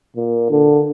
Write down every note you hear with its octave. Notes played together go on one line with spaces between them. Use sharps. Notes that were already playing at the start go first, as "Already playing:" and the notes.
A#2
D3